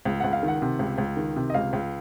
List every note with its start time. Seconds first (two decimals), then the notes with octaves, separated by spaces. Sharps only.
0.05 C#2
0.20 C#2 F#5
0.33 F5
0.43 D#3
0.48 F#5
0.62 C3
0.79 C#2
0.98 C#2
1.17 D#3
1.36 C3
1.50 D#5
1.54 C#2 F5
1.73 C#2